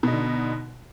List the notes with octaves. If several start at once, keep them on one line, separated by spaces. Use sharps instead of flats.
B2 D3 D#4